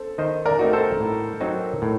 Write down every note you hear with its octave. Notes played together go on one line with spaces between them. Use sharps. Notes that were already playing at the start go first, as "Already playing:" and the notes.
Already playing: A4 C5
D#3 C5 D#5
A#4 D5
A3 C4 D#4 F#4
A4 C5
A2
F#3 C4 D#4 F#4
A2